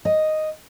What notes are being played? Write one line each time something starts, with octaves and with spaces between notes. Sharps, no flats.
D#5